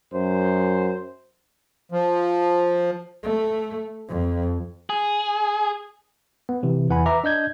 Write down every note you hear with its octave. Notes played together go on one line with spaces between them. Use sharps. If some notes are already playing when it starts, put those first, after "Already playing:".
F#2 C5
F3
A3
F2
G#4
B3
C3 E3
E2 E3 F#5 G#5 B5
B4 E5 A#5 D6
D4 D#5 G6 G#6